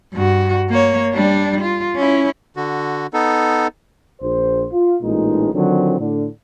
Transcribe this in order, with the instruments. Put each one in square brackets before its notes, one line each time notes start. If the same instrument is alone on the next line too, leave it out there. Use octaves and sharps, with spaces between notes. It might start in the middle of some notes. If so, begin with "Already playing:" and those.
[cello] G2 F#4
A#3 C#5
G3 D4
F4
C#4 E4
[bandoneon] D3 F#4
B3 D#4 A4
[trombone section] A#1 C5
F4
A1 A#2 G#3 D#4
D3 D#3 F3 F#3 C4
A2 D3